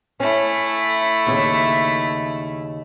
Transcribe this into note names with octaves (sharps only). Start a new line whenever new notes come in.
A3 C#4 E4
D#2 A2 C#3